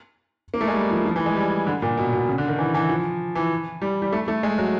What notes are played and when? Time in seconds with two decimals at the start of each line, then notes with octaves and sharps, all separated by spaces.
0.54 A#3
0.61 A3
0.68 G#3
0.74 G3
0.91 F3
1.05 F3
1.16 E3
1.26 G#3
1.36 G3
1.67 D3
1.82 A#2
1.97 B2
2.13 B2
2.29 C#3
2.38 D3
2.48 D#3
2.58 E3
2.74 E3
2.89 F3
3.35 E3
3.82 G3
4.02 G3
4.12 A3
4.28 A3
4.43 G#3
4.58 F#3